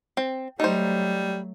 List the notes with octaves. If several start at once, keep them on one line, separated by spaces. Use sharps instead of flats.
C4
F#3 G3 A3 D#4 C5